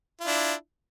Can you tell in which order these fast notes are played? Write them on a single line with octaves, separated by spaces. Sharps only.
F4 E4 D4